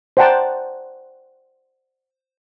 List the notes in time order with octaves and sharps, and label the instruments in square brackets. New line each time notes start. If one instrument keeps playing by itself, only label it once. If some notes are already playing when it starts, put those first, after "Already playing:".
[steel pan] C5 D5 F#5 G5 A5 A#5